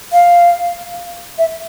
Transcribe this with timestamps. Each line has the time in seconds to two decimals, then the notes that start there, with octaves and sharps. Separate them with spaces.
0.13 F5
1.38 E5